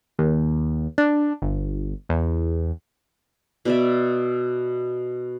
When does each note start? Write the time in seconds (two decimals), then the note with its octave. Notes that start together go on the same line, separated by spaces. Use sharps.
0.19 D#2
0.98 D4
1.42 G1
2.09 E2
3.65 B2 D5 E5